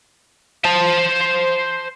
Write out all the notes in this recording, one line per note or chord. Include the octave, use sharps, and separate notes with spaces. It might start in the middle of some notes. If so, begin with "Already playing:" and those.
C5 A5